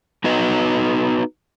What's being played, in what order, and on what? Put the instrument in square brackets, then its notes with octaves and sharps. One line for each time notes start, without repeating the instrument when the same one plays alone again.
[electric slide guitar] B3 D#4 F#4 B4 D#5